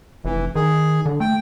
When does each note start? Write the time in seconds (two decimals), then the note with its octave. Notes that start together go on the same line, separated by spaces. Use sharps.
0.25 F1 E3
0.55 D#3 G#4
1.06 D3
1.20 A3 G5